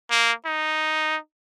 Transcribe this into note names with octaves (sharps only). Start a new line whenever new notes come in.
A#3
D#4